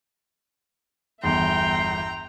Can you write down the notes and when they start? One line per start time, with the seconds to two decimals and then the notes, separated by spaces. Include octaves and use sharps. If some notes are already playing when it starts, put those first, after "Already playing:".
1.24 G1 E2 E5 G5 A#5 C6